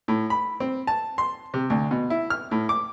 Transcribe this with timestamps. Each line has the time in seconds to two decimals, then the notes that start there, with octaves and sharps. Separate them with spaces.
0.08 A2
0.30 B5
0.60 C4
0.87 A5
1.18 C6
1.54 C3
1.70 D2
1.91 B2
2.10 E4
2.30 F6
2.51 A2
2.69 D6